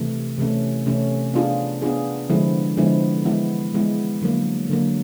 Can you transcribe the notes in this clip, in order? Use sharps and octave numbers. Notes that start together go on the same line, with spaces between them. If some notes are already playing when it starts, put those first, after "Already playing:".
Already playing: C3 E3 A3
C3 E3 A3 C#4
C3 E3 A3 C#4
B3 D4 F4 G#4
B3 D4 F4 G#4
D3 F3 G#3 B3 E4
D3 F3 G#3 B3 E4
E3 G#3 B3 E4
E3 G#3 B3 E4
D3 F#3 A#3
D3 F#3 A#3